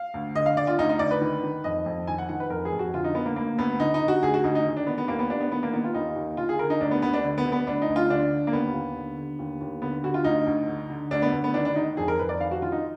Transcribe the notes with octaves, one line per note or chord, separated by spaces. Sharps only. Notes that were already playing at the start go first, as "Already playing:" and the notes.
Already playing: F5
D2
D3 D#5
F5
D3 D5
F4
D2 D#4
D#4
D2 D5
B4
D#3
D#3
F2 D#5
F2
D#3 G#5
F#5
D#3 F#5
B4
F2 A#4
G#4
F2
F#4
D3 F4
D#4
D3 B3
A#3
D2 A#3
D2 B3
D3 D#4
D#4
D3
F#4
D2 G#4
F#4
D2 D#4
D#4
D#3
D4
D#3 B3
B3
D#2 A#3
B3
D#2 D4
B3
D#3 B3
A#3
D#3 B3
F4
D#2 D#4
D#2
D3 F4
G#4
D3 A#4
D#4
D2 D4
B3
D2 B3
D4
D3
B3
D3
B3
D2 D4
D#4
D2
F4
D3 D4
D3
A#3
D#2 B3
D#2
D3
D3
D#2
D#2
D3 B3
D3 F#4
F4
D2 D#4
D2
D3
D3
D2 D4
B3
D2
B3
D#3 D4
D4
D#3 D#4
F2 G#4
A#4
F2 B4
D5
D#3 F5
F#4
D#3 F4
D#4